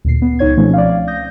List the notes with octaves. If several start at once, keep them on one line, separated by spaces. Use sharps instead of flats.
D2 A#2 C7
B3
C#2 D#4 C#5 G#6
B2 F3 A3 C4 C#4 D#4
D5 F5
D#6 G6 A#6